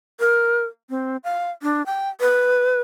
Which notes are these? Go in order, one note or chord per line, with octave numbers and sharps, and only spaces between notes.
A#4
C4
F5
D4
G5
B4